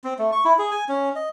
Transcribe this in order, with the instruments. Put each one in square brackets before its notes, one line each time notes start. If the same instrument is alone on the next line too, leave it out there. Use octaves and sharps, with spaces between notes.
[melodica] C4
A3
C#6
E4
G#4
G#5
C#4
D#5